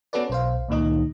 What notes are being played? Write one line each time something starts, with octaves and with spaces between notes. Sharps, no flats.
B3 C#4 F#4 A4 B4 D5
B1 C5 F5
C#2 A#2 D#3 D#4 D#5